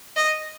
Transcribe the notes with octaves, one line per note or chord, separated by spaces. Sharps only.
D#5